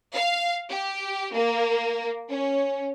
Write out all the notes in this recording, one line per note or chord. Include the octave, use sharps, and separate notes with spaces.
F5
G4
A#3
C#4